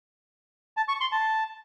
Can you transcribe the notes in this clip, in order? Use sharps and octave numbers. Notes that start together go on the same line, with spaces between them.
A5
C#6
C6
A5